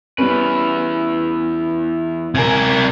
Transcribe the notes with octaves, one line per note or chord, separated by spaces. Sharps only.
E2 G3 B3 C#4 B4
C3 A#4 G#5 G#6